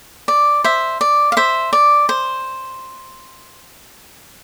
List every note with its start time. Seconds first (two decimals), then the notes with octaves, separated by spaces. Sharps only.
0.28 D5
0.64 C5 E5
1.01 D5
1.32 F5
1.37 C5 E5
1.73 D5
2.09 C5